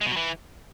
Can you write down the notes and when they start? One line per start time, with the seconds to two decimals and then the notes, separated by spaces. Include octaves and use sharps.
0.01 G#3
0.06 B2
0.11 F#3
0.17 E3